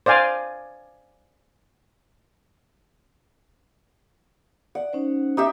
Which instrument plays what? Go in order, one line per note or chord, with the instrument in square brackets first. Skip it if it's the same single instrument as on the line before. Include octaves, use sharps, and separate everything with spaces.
[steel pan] C5 D5 F5 G#5
[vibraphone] D5 [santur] F#5
[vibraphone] C#4 D#4 C5
[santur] D#4 G4 E5